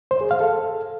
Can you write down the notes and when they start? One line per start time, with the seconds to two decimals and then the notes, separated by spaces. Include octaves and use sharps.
0.11 C5
0.21 G#4
0.31 F5
0.41 A4